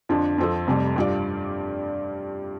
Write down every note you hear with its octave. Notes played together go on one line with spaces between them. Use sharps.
F2 D3 F3 D4
F2 F3 C4 A4
F1 F2 C3 G3
G2 G3 F4 D5